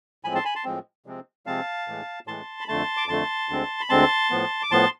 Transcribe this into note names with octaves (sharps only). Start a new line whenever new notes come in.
A2 F3 G#3 C4 G#5 B5
A5 C6
G#5 B5
A5 C6
A2 F3 G#3 C4
C3 F3 G#3 C4
C3 F3 G#3 C4 F5 A5
A2 E3 G#3
A2 E3 G#3 A5 C6
B5
F2 D3 A3 A5 C6
D6
F2 D3 A3 A5 C6
D2 D3 G#3 C4
B5
D2 D3 G#3 C4 A5 C6
A2 F3 B3
D6
A2 F3 B3 A5 C6